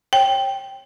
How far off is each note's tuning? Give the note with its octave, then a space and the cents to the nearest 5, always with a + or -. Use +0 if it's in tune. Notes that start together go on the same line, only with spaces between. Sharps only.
C#5 -30 G5 +0